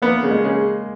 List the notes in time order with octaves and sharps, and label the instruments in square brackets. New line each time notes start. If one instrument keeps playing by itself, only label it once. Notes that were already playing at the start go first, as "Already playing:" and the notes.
[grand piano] A#3 [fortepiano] B3
[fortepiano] C#3
[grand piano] G#3
[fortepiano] C#3